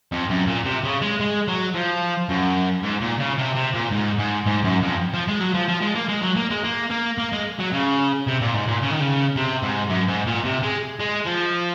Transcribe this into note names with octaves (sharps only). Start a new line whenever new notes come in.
F2
F#2
A#2
C3
C#3
G#3
G#3
F#3
F3
F#2
G#2
A#2
C#3
C3
C3
A#2
G#2
G#2
G#2
F#2
F2
F3
G#3
F#3
F3
F3
G#3
A#3
G#3
F#3
A#3
G#3
A#3
A#3
A#3
G#3
F#3
C#3
C3
A#2
G#2
A#2
C#3
D#3
C#3
C3
G#2
F#2
G#2
A#2
C3
G#3
G#3
F3